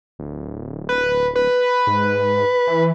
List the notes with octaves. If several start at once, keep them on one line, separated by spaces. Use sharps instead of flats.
D1
B4
B4
G#2
E3